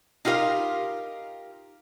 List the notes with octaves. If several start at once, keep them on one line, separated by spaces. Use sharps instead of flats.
D#4 F4 G4 A#4 F5